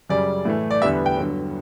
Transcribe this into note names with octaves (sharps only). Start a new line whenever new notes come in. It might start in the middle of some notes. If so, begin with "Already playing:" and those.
F#2 C#3 G3 D5
A2 E3 A3
D5
E2 D3 G3 B3 E5
G5
G2 D3 F#3